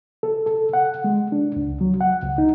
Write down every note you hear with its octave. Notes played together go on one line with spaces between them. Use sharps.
A4
A4
F#5
G#3
D4
C#2
F#3
F#5
C#2
D#4